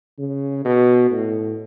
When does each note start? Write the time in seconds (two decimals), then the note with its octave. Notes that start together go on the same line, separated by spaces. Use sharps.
0.18 C#3
0.65 B2
1.11 A2